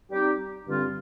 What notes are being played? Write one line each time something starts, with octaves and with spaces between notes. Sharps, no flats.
G3 C4 D#4 G4
G2 D3 G3 C4 F4